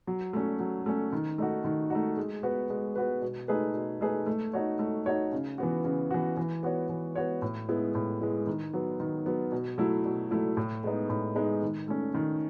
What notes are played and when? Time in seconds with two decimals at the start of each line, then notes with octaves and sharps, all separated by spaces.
0.07 F#3
0.33 A3 C#4
0.60 F#3
0.86 A3 C#4
1.12 D#3
1.38 A3 D#4 F#4
1.64 D#3
1.90 A3 D#4 F#4
2.17 G#3
2.43 B3 F#4 B4
2.70 G#3
2.95 B3 F#4 B4
3.22 B2
3.48 A3 D#4 G#4 B4
3.74 B2
4.01 A3 D#4 G#4 B4
4.26 A3
4.53 D#4 F#4 C#5
4.79 A3
5.06 D#4 F#4 C#5
5.32 C#3
5.58 E3 B3 F#4
5.84 C#3
6.11 E3 B3 F#4
6.37 E3
6.63 B3 F#4 C#5
6.89 E3
7.16 B3 F#4 C#5
7.42 A2
7.69 G#3 B3 E4
7.95 A2
8.21 G#3 B3 E4
8.47 D#3
8.73 F#3 B3
9.00 D#3
9.26 F#3 B3
9.52 B2
9.78 F#3 A3 E4
10.05 B2
10.31 F#3 A3 E4
10.57 A2
10.84 G#3 B3 D#4
11.09 A2
11.35 G#3 B3 D#4
11.62 D#3
11.88 A3 C#4
12.14 D#3